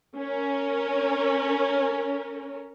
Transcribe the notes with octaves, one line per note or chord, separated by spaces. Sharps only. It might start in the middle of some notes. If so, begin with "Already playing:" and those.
C#4 A#4